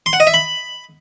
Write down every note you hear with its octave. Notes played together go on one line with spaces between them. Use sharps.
C6
F#5
D#5
E5
B5